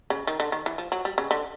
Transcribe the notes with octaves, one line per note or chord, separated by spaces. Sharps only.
C#3
D#3
D3
D#3
E3
F3
F#3
G3
C#3
D3